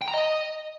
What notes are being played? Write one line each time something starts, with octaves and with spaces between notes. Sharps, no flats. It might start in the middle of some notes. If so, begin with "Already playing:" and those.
G5
A#5
D#5